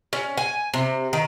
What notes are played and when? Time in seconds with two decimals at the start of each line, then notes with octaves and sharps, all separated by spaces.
0.13 C#4
0.37 G#5
0.74 C3
1.13 D#3